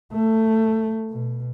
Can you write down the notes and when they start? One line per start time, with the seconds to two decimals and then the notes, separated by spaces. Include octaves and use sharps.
0.13 A3
1.10 B2